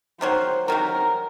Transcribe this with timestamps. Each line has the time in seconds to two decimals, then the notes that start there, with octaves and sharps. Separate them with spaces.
0.21 C3 D#3 F#3 C5
0.68 C3 D#3 F#3 A#4